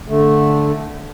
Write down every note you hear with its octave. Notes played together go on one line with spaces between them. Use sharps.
D3 A3